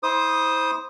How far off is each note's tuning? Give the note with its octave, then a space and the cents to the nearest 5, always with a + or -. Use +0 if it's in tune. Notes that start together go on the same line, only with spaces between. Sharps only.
E4 -35 C5 +0 D#6 -5